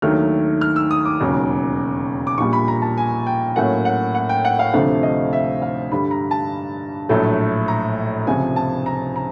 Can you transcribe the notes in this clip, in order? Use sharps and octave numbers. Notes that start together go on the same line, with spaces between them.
D#2 D#3 F#3 A3 D4 F6
F6
E6
D#6
D6
E1 D#2 C#3 F#3
D6
A#1 A#2 G3 C#6
B5
A#5
A5
G#5
G5
A2 F#3 A#3 C#4 F#5
F#5
F#5
G5
F#5
F5
D2 C3 F3 A3 D4 F5
D#5
E5
F5
G2 D3 G3 B5
A#5
A5
A#1 A2 F#3 A3
A#5
C#2 C3 F3 G#5
A5
A#5
A#5